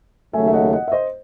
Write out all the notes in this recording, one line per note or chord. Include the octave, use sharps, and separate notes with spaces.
D#2 C#3 F#3 A3 E5 G#5
E5
D#5 F#5
D#5 F#5
E5
C5 D#5